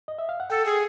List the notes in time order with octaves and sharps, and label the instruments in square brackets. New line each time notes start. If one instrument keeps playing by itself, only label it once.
[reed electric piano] D#5
E5
F5
F#5
[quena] A4 [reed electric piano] G5
[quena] G#4